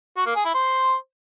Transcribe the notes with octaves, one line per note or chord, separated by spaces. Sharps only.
F#4
A#3
G#4
E4
C5